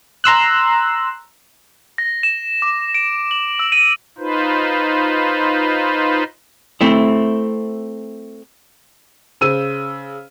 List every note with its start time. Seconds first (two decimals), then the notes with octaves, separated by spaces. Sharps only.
0.24 A#5 C6 E6 F#6
1.98 A#6
2.23 E7
2.62 D6
2.94 D7
3.31 F#7
3.59 E6
3.72 D#7
4.18 D#4 F4 B4 C5
6.81 A3 C4 E4
9.41 C#3 C5 E6 D#7